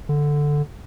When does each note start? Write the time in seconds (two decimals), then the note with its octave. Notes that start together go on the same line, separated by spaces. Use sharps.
0.09 D3